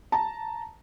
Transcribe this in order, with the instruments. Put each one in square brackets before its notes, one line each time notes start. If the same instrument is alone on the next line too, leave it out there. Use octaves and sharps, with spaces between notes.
[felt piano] A5 A#5